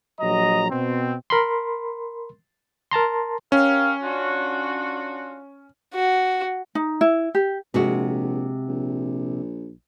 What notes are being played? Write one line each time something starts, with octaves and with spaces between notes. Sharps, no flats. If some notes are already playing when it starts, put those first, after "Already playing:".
A#1 F#3 D#5 A#5
B2 C4
A#4 B5 C6
A#4 A5 A#5 C6
C#4 G4 A#4 F5
D4 F4 F#4
F#4
D#4
E4
G4
A#1 C3 G#3 F#4
A#1